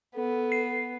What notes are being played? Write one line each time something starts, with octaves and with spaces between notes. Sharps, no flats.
B3 A4
C7